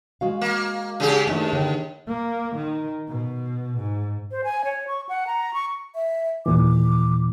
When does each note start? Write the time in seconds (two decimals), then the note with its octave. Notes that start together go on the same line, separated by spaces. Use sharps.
0.21 G#3 F#4 F5
0.41 A#3
1.00 C#3 G4 G#4
1.27 D#2 A3 D4 A4
1.53 D3 C#5 G5
2.07 A#3
2.55 D#3
3.09 B2
3.78 G#2
4.31 C5
4.44 G#5
4.64 C#5
4.88 C#6
5.09 F#5
5.27 A#5
5.54 C#6
5.95 E5
6.46 D#2 A#2 E3 D6